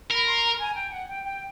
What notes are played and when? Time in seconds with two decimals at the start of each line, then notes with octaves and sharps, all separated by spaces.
0.10 A#4 B5
0.26 C6
0.43 A#5
0.59 G#5
0.75 G5
0.92 F#5
1.09 G5
1.25 G5